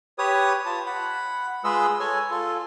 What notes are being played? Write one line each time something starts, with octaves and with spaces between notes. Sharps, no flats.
G4 B4 C#5 D#6
F4 A5
F#5 B5
G#3 F4 G#4 B4 D#5 E6
A4 C#5 G#5
F4 A4